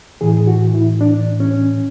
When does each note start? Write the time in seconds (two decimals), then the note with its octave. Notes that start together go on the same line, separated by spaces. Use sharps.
0.21 A2 E3 G#4
0.47 F#4
0.74 E4
1.01 D4
1.40 C#4